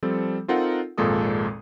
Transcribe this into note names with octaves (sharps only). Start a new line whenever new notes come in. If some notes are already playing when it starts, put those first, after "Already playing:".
F3 G3 C4 A4
C4 D#4 F4 A4 A#4 F#5
G#1 F2 A#2 G#3 A4 D#6